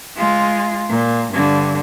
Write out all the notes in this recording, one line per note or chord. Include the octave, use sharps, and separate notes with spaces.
G#3 F4
A#2
G2 D3